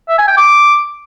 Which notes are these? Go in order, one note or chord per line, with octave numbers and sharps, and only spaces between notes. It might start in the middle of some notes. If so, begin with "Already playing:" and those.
E5
G#5
G5
D6